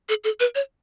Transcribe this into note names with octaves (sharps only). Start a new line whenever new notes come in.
A4
A4
B4
C#5